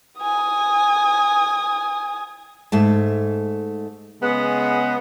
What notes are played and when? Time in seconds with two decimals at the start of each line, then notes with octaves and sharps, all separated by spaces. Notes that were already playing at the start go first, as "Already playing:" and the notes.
0.21 G#5 D#6
2.72 G#2 A3 A5
4.22 C#3 G#3 B3